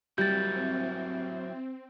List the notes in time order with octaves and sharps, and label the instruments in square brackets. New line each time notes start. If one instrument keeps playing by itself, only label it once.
[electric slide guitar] F#3 E4 [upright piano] G3 [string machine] C4 [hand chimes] G6 A6